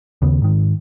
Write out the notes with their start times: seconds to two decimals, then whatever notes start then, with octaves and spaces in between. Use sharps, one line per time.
0.22 D#2 C#3 B3
0.42 G#2 D#3